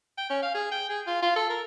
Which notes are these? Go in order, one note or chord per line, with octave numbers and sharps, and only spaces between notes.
G5
C#4
F5
G#4
G5
G#4
F4
F4
A4
A#4